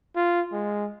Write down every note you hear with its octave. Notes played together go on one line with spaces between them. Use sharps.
F4
G#3